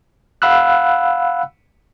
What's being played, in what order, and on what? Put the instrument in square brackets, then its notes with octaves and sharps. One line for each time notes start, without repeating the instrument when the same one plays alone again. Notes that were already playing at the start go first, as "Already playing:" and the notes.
[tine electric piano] F5 F#5 B5 E6 F#6